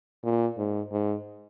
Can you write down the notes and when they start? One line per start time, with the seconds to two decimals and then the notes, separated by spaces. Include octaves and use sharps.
0.24 A#2
0.58 G#2
0.92 G#2